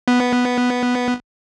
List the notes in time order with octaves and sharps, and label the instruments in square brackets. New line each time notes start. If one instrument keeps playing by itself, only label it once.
[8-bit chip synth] B3